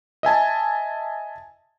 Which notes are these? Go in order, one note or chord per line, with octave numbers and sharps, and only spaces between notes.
D#5 E5 G#5 A5